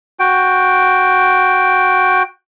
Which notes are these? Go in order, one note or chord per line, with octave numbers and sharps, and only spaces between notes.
F#4 G5